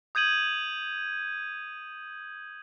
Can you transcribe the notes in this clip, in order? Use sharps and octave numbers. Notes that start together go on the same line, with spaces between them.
D#6 G6 G#6 D#7 F#7